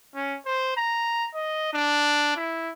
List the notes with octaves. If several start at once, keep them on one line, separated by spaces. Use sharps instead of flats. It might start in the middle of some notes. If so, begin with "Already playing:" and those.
C#4
C5
A#5
D#5
D4
E4